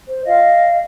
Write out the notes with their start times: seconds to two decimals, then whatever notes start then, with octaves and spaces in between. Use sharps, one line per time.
0.09 C5
0.26 F4 D#5 F5